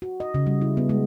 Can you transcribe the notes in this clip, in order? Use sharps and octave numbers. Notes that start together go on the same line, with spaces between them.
F#4
D#5
C#3
G3
E4
B3
G#3